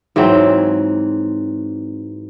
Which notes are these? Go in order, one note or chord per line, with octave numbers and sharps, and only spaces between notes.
G#2 E3 F#3 C4